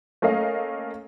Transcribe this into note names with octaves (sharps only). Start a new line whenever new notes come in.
A3 A#3 C#4 D#5 F5